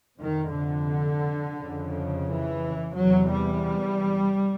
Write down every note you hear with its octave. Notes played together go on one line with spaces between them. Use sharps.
F2 C3 D#3
D3
F2 C#3
E3
E2 C3 F#3
G3